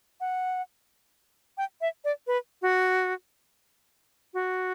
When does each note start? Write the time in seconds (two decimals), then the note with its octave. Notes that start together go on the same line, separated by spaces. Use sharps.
0.20 F#5
1.58 G5
1.81 E5
2.04 D5
2.27 B4
2.62 F#4
4.34 F#4